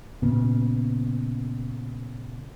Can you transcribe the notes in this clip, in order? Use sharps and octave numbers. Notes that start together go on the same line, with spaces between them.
A#2 C#3 B3